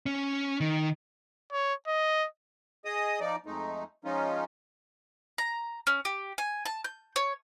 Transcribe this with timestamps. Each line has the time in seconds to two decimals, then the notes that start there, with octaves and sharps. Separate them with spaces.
0.06 C#4
0.61 D#3
1.52 C#5
1.87 D#5
2.85 G#4 D#5 D#6
3.20 F3 D#4 D5
3.46 F2 G#3 A3 D#4
4.05 F3 G#3 C#4 D#4 F4
5.38 A#5
5.87 C#4
6.05 G4
6.38 G#5
6.66 A5
6.84 G6
7.16 C#5